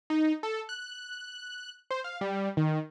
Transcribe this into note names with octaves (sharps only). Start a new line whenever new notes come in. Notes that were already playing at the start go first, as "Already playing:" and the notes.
D#4
A4
F#6
C5
F5
G3
D#3